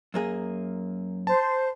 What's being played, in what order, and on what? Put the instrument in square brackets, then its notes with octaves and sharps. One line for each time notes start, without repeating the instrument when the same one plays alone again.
[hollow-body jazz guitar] F#2 A#3 G#4
[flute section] C5 [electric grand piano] A5